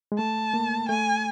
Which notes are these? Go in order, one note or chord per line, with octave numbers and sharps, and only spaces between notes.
G#3
A3 A5
A#3
A3 G#5